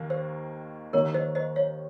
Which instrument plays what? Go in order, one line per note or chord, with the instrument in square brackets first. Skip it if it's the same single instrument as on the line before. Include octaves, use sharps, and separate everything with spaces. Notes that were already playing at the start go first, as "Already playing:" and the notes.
Already playing: [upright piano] D#2 D#3 A#3
[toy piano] C5
[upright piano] D#2 D#3 A#3 [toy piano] A#4 C#5
[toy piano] C5 D#5
C5 D#5
C#5 F5